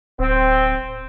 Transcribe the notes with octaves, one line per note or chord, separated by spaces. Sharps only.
D1 C4